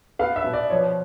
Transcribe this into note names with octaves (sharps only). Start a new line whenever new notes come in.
B3 F5
E5
B2
D5
F3 C#5